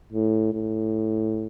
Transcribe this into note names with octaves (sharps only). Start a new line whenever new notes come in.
A2
A2